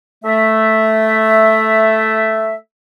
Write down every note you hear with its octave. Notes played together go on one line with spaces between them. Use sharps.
A3 E5